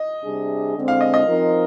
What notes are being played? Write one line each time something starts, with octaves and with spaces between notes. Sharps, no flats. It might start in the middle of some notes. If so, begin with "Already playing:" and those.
Already playing: D#5
C3 G3 D4 G#4
D3 G#3 C4
F5
D#5
D#5
F3 C4 D#4 A#4